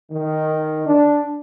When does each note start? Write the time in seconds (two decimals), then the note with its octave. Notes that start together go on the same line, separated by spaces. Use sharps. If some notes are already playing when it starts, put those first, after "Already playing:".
0.11 D#3
0.86 D4